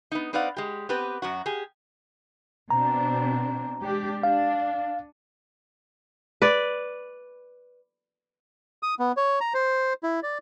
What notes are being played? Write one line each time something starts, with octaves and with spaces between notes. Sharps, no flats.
B3 D#4
C4 D#4 B4 D5 F5 F#5
G#3 G4
B3 C4 G4 B4
F#2 F#3 F#4
G4 G#4
B2 C4 D4 A#5
G#3 D4 G4
D4 F5
B4 D5
D#6
B3
C#5
A#5
C5
E4
D5